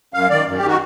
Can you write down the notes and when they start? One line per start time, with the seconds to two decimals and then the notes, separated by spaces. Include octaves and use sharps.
0.14 F#2 F5
0.30 D#3 D5
0.46 F#2
0.57 G4
0.63 D#3 F#4